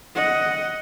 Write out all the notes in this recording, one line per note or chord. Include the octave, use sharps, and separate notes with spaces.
D#5 F#5